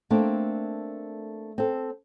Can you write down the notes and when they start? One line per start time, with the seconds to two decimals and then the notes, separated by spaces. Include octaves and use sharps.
0.10 A3 A#3 C4 D4
1.58 C4 A4